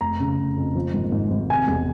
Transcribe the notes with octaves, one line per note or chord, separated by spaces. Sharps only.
F1 A#5
C#3
F1
F2
F3
G#1
G#2
G#1
C3 G#5
E1